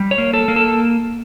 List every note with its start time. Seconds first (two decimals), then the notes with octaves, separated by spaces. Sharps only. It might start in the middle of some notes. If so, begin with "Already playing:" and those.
Already playing: G3
0.11 C#5
0.18 A#3
0.34 A4
0.48 A#3
0.56 A4